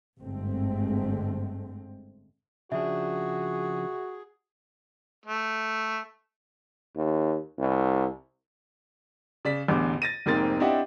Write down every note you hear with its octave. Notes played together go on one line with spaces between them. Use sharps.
G1 G#2 D3 G#3 A3 C4
C#3 F3 D4 F#4 G#4 E5
A3
D#2
C2
C#3 D5 B6
A1 E2 D3 D6
A6 A#6 D#7
F1 G#2 A#3 C4 A6
C4 D4 E4 G4 D#5 F#5